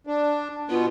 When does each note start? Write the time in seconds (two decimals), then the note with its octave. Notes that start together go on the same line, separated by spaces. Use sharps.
0.07 D4
0.70 B2 B3 F4